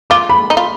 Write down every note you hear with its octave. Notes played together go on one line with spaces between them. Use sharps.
F4 D6
B5
D#4
F4